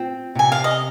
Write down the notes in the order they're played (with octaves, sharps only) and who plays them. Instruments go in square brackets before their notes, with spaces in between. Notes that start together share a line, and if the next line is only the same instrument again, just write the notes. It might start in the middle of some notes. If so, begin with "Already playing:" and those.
Already playing: [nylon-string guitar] C4 F4
[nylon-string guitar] C3 [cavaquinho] G#5
[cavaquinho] F5
D#5